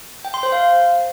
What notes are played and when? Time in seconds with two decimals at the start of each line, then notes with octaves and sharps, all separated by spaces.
0.25 G5
0.34 C6
0.43 C5
0.52 F5